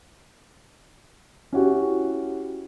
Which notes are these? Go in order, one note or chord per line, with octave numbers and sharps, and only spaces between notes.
C#4 E4 F#4 G4